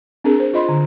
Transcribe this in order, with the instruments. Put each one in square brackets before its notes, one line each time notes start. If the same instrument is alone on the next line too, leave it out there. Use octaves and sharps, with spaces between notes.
[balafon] C4 D4 G#4 A#4
C5
F4 C5 D#5 B5 C6
D3